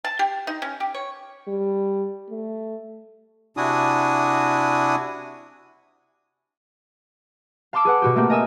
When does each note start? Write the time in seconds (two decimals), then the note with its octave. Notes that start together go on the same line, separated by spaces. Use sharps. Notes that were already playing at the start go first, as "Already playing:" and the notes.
0.04 A5
0.19 G4
0.47 D#4
0.62 C#4
0.80 G4
0.94 C#5
1.48 G3
2.30 A3
3.57 C3 D4 E4 F#4 G#5 D#6
7.73 F5 A5 C6 D6 E6 D7
7.85 G#4 B4 F#5
8.02 B2 F#4 G4
8.16 A3 A#3 C4 G4
8.30 A#4 D#5 G#5 D#6 E6 A#6